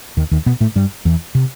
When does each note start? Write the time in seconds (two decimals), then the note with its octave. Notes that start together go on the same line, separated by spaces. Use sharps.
0.17 D#2 D#3
0.31 D#2 D#3
0.46 B2 B3
0.60 A2 A3
0.76 G2 G3
1.05 E2 E3
1.35 C3